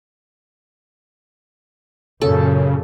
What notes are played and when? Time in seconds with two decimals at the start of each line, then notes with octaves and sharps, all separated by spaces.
2.22 F#2 A#2 C#3 A4